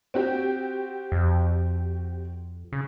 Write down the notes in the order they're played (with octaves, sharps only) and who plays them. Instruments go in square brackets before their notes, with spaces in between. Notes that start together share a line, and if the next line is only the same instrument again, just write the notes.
[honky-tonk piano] C4 F#4 G4
[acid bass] F2
C#3